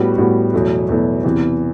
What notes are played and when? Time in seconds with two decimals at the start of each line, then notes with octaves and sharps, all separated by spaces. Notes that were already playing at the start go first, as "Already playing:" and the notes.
Already playing: A2 G3 B3 F#4
0.18 A2 G3 B3 F#4
0.54 E2 B2 F#3 A3 E4
0.89 E2 B2 F#3 A3 E4
1.24 E2 C3 E3